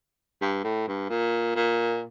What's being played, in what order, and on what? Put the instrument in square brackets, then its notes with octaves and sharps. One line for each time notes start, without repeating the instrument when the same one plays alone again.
[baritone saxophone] G2
A2
G2
A#2
A#2